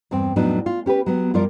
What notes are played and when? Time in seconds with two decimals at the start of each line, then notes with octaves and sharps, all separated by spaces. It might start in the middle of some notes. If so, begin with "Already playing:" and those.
0.11 E2 G2 C4 G5
0.36 F2 A2 F#3 B3 D4 D#4
0.66 F4
0.86 C#4 G4 A#4 B4
1.06 F#3 B3
1.34 F#2 F3 G3 F4 A#4 D5